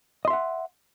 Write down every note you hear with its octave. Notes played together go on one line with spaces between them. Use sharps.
D#5 E5 F#5 C6